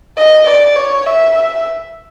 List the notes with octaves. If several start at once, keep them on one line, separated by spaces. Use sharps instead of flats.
D#5
D5
C#5
E5
E5